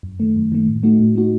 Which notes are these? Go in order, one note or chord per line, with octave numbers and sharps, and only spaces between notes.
F#2
D#3 A3
F#2
D#3 A3
A2
A3 D#4 F#4
A2
A3 D#4 F#4